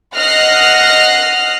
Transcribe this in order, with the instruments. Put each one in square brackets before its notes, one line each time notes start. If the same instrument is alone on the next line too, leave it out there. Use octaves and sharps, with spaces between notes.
[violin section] D#5 F#5 F6 F#6 A#6 C7